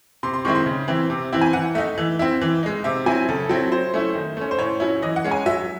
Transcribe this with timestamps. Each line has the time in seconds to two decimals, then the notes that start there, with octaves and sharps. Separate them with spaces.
0.23 C3 C6
0.34 C6
0.45 D#3 G#3 C4 E4 C#6
0.55 C6
0.66 C#3
0.88 E3 C4 E4
1.10 C3
1.33 E3 C4 E4
1.41 G#5
1.53 E3 F#5
1.75 A3 D#4 E5
1.98 E3
2.19 C4 E4
2.41 E3
2.63 G#3 D#4
2.84 C3 E5
3.06 F#3 C4 E4 G#5
3.29 C#3 A4
3.49 F#3 C4 E4
3.72 F#3 C5
3.94 A3 C#4 E4
4.15 D#3
4.37 A3 C#4
4.51 C5
4.59 A2 C#5
4.80 F#3 C#4 E4
5.02 E3 D#5
5.16 F#5
5.24 G#3 C#4
5.31 G#5
5.46 F#3 E5